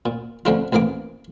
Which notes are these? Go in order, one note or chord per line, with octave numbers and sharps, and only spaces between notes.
A#2
F2 D3 F3 A3 D4 F4
A1 F2 E3 A#3 D6